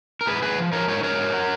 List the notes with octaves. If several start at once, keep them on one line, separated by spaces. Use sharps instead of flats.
A#4
G#2 G#4 B4
G#2 G#4 B4
F3
F3 A#4 C#5
G#2 A#4 C#5
G#2 A#4 C#5
F#3
F#3